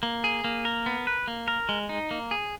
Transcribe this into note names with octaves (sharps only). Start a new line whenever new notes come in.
A#3
G#4
A#3
A#4
B3
B4
A#3
A#4
G#3
D#4
A#3
G#4